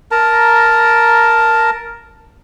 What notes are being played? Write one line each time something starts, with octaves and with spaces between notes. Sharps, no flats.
A#4 A5 A#5